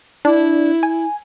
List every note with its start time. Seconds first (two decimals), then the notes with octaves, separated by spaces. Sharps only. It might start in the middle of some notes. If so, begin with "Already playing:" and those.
0.25 D4 E4
0.83 G#5